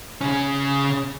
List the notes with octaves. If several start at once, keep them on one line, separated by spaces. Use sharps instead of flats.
C#3 C#4